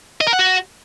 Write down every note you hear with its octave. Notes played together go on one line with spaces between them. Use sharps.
D#5
A#4
F#5
F#4